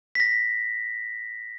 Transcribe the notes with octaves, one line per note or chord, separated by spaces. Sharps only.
B6
A#6